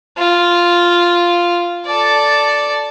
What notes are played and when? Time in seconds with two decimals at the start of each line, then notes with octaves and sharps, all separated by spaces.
0.18 F4
1.86 A4 D5